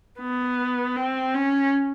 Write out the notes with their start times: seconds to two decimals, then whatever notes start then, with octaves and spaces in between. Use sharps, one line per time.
0.20 B3
0.96 C4
1.34 C#4